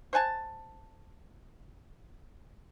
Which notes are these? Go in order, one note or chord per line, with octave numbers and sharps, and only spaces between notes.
C5 F#5 G#5 A5